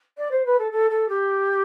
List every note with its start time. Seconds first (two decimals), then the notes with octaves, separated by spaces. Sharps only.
0.18 D5
0.31 C5
0.45 B4
0.59 A4
0.72 A4
0.90 A4
1.09 G4